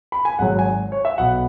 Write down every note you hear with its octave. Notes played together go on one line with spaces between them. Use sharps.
B5
G#5
G#1 G#2 F#3 F#5
G#5
C#5
E5
B1 B2 B3 F#5